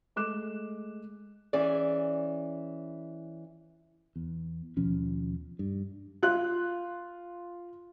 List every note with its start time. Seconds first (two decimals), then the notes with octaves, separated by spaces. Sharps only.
0.16 G#3 A3 D6 F#6 E7
1.53 E3 C#4 G#4 D5
4.16 E2
4.77 D#2 B2 F3 C#4
5.59 G2
6.23 F4 F#6